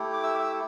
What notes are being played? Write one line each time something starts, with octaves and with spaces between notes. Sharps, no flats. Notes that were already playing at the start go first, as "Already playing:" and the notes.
Already playing: A3 E4 G4
D6
E5 E6
D6
E5 E6